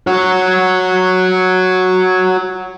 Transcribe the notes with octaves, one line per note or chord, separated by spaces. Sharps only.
F#4 C#5